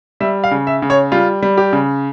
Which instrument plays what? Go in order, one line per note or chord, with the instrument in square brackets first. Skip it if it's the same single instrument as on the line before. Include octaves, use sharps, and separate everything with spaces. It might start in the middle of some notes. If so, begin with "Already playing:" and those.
[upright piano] G3 E5
F5
C#3
E5
C#3
C#5
G3 F4
G3
G4
C#3